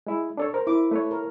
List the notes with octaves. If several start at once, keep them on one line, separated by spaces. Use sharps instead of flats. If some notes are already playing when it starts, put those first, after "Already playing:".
G#3 E4
D4 A4 C#5
A#4 C5
E4 D6
A3 B4 C#5
A#4